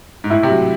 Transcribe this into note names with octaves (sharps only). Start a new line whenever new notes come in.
G#2
A2 E4
C3
F#3